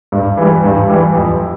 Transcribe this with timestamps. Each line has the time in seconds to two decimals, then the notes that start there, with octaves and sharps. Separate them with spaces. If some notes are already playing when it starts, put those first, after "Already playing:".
0.12 G2
0.37 E3 G3
0.64 G2
0.90 E3 G3
1.15 F2